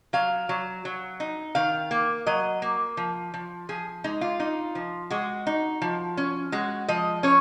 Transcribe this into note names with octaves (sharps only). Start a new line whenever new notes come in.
F#3 F5
F#3
F#3
D#4
D#3 F5
A#3
F#3 D#5
A#3
F3
F3
F3 G#4
G#3 D#4
F4
D#4
F3
G#3 F#4
D#4
F3
C#4
G#3 F#4
F3 D#5
C#4 C#5